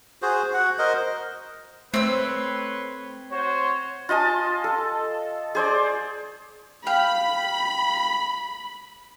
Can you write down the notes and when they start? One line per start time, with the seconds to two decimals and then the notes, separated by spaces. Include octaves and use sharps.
0.22 F#4 G#4 C5
0.54 F#4 F#5
0.79 A#4 C5 D#5
1.94 A3 C4 B4 C#5 C6 E6
3.32 F#4 C5 C#5
4.09 F4 D#5 G#5 A5
4.64 A4
5.55 G#4 C5 D5
6.87 F5 G5 B5